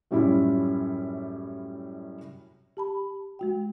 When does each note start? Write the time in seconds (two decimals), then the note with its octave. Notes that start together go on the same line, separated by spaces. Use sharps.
0.11 F#2 A2 G3 C#4 E4 F4
2.77 G4 A5 B5
3.39 G#3 F#4 G5